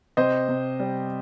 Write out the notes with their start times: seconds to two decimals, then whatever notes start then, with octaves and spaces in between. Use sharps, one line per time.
0.17 C3 C5 D#5
0.49 C3
0.79 G3